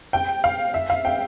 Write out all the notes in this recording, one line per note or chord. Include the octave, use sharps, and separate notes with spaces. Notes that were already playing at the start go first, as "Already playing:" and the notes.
G5
F5
E5
F5
G5